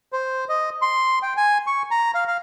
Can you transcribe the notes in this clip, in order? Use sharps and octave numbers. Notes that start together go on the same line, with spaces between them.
C5
D#5
C6
G5
G#5
C#6
A#5
F5
F5